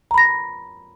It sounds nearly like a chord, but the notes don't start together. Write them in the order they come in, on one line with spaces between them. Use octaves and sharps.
A#5 B5 A#6